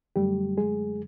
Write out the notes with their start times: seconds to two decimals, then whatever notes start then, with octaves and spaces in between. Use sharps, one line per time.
0.16 F#2 D3 F#3 G3 A3 G4
0.58 G#3 G#4